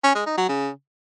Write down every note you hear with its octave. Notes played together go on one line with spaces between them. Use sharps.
C#4
G#3
D#4
F#3
C#3